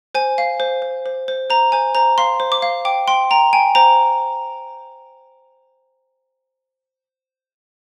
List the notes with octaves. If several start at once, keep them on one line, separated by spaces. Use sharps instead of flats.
C5 G#5
F5
C5
C5
C5
C5
C5 A#5
C5 G#5
C5 A#5
F5 C6
C5
D6
F5
G5 D6
G5 C6
G5 A#5
G5 G#5
C5 A#5